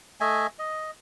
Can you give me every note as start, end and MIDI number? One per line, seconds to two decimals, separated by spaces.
0.20 0.47 57
0.20 0.47 75
0.20 0.47 76
0.20 0.47 80
0.59 0.91 75